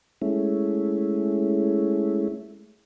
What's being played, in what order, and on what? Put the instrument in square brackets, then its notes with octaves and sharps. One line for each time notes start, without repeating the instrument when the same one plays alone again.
[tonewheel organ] G#3 A3 C#4 E4